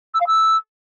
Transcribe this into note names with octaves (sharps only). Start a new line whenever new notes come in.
E6
F5
E6